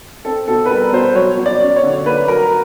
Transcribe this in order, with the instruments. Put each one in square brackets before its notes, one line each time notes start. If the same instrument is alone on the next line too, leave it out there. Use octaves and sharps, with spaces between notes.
[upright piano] C4 A4
B2 A4
B4
G3 A#4
B2 C5
F#3 C#5
F#3
D5
C#4
C#5
D3
A#3 B4
F#3 A#4